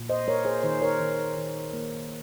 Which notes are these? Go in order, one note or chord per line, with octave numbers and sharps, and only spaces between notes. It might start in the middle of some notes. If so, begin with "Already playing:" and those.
Already playing: A#2
C5 D#5
A#3 A#4 C#5
G#4 C5
D#3 G#4 C5
A#4 C#5
D#3
D#3
A#3